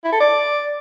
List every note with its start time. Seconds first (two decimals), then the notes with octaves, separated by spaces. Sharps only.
0.04 E4
0.12 A4
0.20 D5